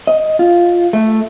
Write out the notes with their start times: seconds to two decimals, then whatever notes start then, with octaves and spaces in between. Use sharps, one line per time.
0.07 D#5
0.39 F4
0.93 A3